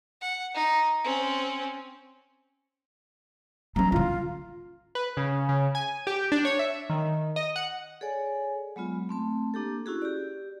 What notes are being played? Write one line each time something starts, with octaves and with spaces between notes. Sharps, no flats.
F#5
D#4
C4 C#4
F#3 C#4 A#5
D3 E4 F4
B4
C#3
C#3
G#5
G4
D4
C#5
E5
D#3
D#5
F#5
G#4 A4 C#5 D5 G#5
F#3 G#3 B3 F4
A3 C4 A5
A#3 D4 G4 A4
C#4 E4 F#4 G#4
G4 D5